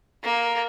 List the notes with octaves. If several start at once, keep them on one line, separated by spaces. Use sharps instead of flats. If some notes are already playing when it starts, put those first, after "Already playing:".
A#3